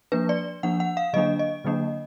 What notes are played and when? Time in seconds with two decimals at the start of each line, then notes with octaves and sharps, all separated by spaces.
0.12 F3 A#3 D4 B4
0.29 D5
0.63 F3 A#3 D4 F#5
0.80 F#5
0.97 F5
1.13 D3 F#3 A#3 D4 D#5
1.39 D#5
1.64 D3 F#3 A#3 D4